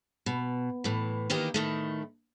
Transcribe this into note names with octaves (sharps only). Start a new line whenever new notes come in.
B2
A2 E3
D#3 E3 A#3 D#4 G4
A2 D#3 A3